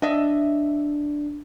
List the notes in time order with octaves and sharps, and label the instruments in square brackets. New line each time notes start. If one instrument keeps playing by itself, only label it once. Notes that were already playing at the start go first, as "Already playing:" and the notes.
[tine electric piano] D4 [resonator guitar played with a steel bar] D#5 E5